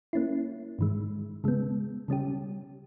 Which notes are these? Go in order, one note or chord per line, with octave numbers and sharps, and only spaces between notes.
A#3 C#4 E4
G#2 D#3 G#3
C#3 G#3 B3
C#3 G3 C#4 G4